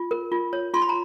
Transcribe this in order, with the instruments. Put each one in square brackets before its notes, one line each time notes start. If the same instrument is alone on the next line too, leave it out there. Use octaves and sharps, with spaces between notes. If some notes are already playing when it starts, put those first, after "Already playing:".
Already playing: [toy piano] F4
A#4
F4
C#5
F4 C6
B5
A#5